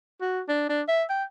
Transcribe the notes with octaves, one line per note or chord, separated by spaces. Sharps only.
F#4
D4
D4
E5
G5